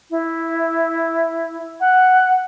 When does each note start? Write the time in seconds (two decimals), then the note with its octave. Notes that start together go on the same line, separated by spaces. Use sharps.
0.10 E4
1.80 F#5